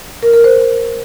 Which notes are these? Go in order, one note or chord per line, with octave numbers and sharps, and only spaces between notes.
A#4
A#4
C5